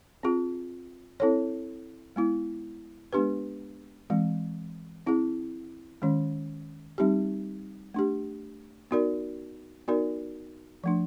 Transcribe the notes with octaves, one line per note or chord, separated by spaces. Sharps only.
C4 F4 G#4
C4 E4 A4 C#5
G#3 B3 E4
G#3 B3 D4 G4 B4
E3 G#3 C4
C4 E4 G#4
D#3 G#3 C#4
G3 C4 D#4 G4
A3 D4 G4
B3 D#4 F#4 A#4 D5
B3 D#4 F#4 A#4 D5
F3 A3 D4